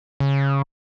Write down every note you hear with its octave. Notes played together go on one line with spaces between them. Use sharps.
C#3